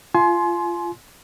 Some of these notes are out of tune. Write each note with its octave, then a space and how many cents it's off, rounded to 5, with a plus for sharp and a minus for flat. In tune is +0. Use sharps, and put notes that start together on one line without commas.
F4 -15 G#5 +35 C6 +0